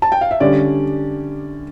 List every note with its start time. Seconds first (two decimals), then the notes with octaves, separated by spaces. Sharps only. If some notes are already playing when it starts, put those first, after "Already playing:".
0.02 A5
0.12 G5
0.21 F5
0.31 E5
0.40 D3 G3 C#4 D5